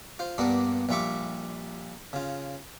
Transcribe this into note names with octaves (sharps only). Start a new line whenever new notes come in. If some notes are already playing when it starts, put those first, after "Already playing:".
F4 C5
G2 A#2 G3 A#3 B3 D4
A#1 G3 F4 E5 C#6 D6
C#3 F4